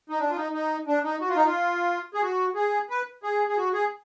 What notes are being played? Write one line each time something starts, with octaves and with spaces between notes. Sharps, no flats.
D#4
D4
F4
D#4
D#4
D4
D#4
F#4
F4
D#4
F4
G#4
F#4
G#4
B4
G#4
G#4
F#4
G#4